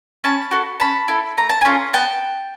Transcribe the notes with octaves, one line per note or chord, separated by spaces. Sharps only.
C#4 A5 B5
F#4 A4
C#4 A5 B5
E4 A4
A3 A#5
A5
C#4 F4 A4 G#5 A#5
B3 G5 A5